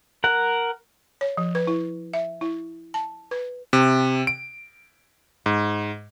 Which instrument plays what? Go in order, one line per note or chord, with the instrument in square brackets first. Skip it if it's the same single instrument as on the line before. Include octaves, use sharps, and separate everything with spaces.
[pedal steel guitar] A#4 F#5
[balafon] C#5
F3
B4
E4
E5
E4
A5
B4
[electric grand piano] C3
D7
G#2